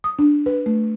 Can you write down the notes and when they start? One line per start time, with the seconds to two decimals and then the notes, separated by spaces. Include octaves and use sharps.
0.04 D#6
0.19 D4
0.46 B4
0.66 A3